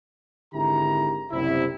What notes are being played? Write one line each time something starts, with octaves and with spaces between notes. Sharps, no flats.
G#1 D3 E4 G4 A#5
F#1 C2 C3 E4